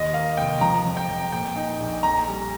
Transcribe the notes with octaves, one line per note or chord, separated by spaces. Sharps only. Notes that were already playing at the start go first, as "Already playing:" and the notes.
Already playing: D#2 D#5
A#3 F5
F1 G5
F3 A#5
F2
G5
F2
A#2 G5
D#4
A#1
F2 A#5
G3